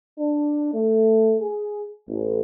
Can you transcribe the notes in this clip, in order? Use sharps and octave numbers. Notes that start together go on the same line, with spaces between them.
D4
A3
G#4
A1